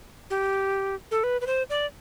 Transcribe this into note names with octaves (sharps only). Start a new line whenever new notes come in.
G4
A4
B4
B4
C5
D5